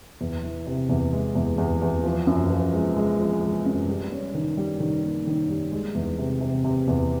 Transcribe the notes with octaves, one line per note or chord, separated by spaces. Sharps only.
E2
E3
C3
E2
G#3
E2
E2
E2
F3
F#2
F3
G#3
G#3
F3
G#3
F#2
G3
C#4
D#3
G3
D#3
A#3
D#3
G3
G#3
E2
C3
C3
C3
E2